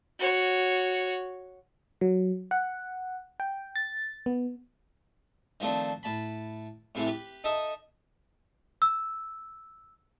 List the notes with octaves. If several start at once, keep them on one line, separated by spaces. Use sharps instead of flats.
F#4 C#5
F#3
F#5
G5
A6
B3
D#3 F3 A3 C4 D4
A2 A5 B5
A2 C3 E3 A3
G4 B4
D#4 A4 D#5 E5
E6